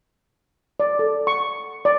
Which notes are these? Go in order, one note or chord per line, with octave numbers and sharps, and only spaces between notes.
D5
A4
C#6
D5